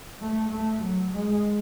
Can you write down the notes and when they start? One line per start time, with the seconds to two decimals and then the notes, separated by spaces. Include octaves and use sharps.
0.20 A3
0.51 A3
0.82 F#3
1.14 G#3